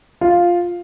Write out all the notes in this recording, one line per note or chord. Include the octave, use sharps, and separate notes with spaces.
F4